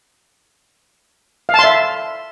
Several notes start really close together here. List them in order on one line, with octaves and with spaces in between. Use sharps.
F5 A5 C6 E5